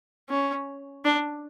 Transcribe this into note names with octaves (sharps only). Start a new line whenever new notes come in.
C#4
D4